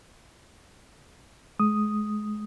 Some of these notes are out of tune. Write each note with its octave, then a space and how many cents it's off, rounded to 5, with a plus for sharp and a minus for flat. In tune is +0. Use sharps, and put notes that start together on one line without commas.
G#3 +30 D#6 +0